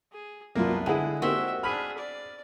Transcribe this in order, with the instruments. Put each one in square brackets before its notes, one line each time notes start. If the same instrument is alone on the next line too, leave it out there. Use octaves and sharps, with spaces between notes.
[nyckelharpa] G#4
[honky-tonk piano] C2 F#2 [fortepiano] A#3 F4 [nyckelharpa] B3 D4
[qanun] D3 [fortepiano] G#3 E4 [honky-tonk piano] G#4 F#5 D#7
[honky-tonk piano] A#3 D#4 G4 [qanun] C4 F#4 G5 [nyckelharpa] E5
[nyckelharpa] D4 G#4 [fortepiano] B5 [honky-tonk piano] F6 B6
[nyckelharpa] D5